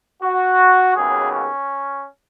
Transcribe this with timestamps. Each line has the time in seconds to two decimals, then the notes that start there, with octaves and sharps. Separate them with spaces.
0.22 F#4
0.95 D#2 C#3 F#3 B3 G#4
1.31 C#4